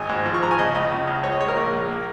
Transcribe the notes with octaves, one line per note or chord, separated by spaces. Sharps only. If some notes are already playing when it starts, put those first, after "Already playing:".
Already playing: G#1 G#5
G#2
F3
C#6
F3 A#5
G#5
C#3 D#5
C#2 D#5
C#3
C#2
G#3 C#5
D#5
G#3 C#5
A#4
A#1
A#1
A#3